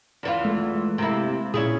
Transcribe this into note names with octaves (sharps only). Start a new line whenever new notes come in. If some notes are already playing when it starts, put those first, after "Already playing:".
E2 E3 F4
G#3 A3
C3 A#3 E4
A#2 C#4 E4 G#4